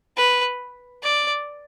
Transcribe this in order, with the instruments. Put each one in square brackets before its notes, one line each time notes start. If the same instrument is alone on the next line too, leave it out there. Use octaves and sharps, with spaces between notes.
[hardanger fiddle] B4
D5